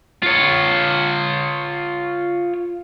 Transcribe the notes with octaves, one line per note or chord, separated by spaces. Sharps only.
F4 C#5